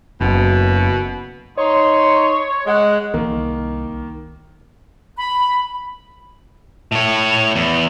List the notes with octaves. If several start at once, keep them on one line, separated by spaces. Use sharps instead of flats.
F#1 B2
D#4 C#5 C6
G#3 F#5
C2 D#3 A#3
B5
A2 C#5
E2